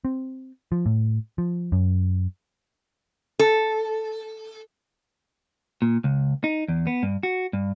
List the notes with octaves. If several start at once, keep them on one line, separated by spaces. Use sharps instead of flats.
C4
F3
A2
F3
F#2
A4
A#2
C#2
D#4
E2
B3
G2
F#4
G2